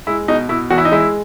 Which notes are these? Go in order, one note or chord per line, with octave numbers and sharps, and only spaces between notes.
G#3 E4
B2 D#4
B2 E4
E2 F#4
E4
D#4
G#3 E4